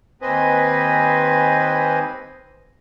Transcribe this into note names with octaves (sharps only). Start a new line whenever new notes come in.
D#2 C4 B4 C5 D#5 G#5